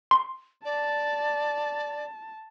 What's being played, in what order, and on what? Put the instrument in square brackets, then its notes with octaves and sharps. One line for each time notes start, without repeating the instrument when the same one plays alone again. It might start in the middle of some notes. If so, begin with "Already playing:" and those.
[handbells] C6
[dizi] D5 [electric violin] A5